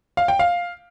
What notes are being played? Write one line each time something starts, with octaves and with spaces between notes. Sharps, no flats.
F5
G5
F5